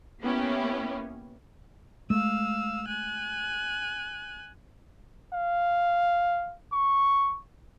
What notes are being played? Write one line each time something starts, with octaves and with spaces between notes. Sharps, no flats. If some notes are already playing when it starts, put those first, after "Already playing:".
A#3 B3 C#4 E4 G4
G#3 A3 F5 E6
G#5 F#6
F5
C#6